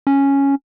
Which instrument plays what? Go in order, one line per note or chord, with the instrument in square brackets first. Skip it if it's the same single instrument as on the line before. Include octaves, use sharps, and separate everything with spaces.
[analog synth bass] C#4